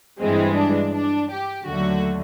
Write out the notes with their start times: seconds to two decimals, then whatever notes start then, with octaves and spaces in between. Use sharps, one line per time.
0.20 G2 E3 G#3 C4
0.56 D4
0.94 D4
1.31 G4
1.68 D#2 D3 F#3 A3 F#4